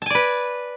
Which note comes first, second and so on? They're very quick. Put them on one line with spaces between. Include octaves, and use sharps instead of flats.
A5 G#5 D5 B4